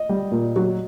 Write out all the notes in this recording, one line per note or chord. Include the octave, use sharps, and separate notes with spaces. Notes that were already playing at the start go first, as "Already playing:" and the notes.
Already playing: D#5
G3
A#2
F#3